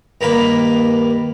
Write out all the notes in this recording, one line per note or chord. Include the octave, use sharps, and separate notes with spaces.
G2 D#3 A#3 B5